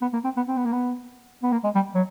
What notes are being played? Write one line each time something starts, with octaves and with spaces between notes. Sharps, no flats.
B3
A#3
C4
B3
C4
B3
A#3
B3
B3
A#3
G#3
G3
F#3